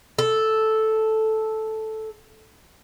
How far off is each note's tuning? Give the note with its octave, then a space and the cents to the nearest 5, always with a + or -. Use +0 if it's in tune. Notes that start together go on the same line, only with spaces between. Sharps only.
A4 -5